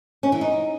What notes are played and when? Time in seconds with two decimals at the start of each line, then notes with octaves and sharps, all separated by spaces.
0.23 C#4
0.32 E3
0.41 D#4